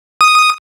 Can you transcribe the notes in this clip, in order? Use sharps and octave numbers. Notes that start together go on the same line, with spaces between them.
D#6